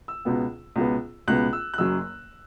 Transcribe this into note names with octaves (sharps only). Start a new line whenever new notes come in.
E6
C#2 B2 B3
C#2 B2 B3
C#2 B2 B3 F#6
E6
F#6
F#1 F#2 F#3 E6